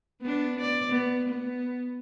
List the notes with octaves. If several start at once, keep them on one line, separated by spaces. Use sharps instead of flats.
B3 D4
D5
B3
B3